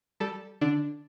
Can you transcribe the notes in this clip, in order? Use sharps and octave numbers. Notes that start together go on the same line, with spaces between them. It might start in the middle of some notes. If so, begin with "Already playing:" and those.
G3 A4
D3 D4